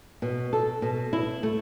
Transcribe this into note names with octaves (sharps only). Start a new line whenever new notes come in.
B2
A4
B2
E4
A3